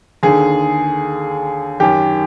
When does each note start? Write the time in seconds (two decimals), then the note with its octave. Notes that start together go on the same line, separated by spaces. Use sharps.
0.23 D#2 D3 G#4
1.80 F#2 D#3 G4